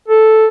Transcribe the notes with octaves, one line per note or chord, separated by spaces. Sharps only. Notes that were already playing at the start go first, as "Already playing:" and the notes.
A4